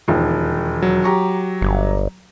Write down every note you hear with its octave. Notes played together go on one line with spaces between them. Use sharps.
E1 D#2 F3
F#3
G4 A#5 C#6
G1